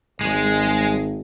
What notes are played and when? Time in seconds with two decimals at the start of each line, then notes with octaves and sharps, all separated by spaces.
0.21 G#1 G#3